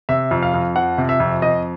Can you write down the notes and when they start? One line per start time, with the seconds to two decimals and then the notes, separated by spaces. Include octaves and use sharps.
0.09 C3 E5
0.31 F2
0.42 F5
0.54 F2
0.76 F3 F#5
0.98 C3
1.09 E5
1.20 F2
1.42 F2 D#5